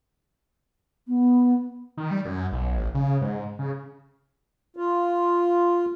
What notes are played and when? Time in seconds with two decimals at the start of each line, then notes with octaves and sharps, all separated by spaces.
1.08 B3
1.97 D#3
2.11 G3
2.25 F#2
2.52 B1
2.77 A1
2.95 C#3
3.21 G#2
3.59 C#3
4.77 F4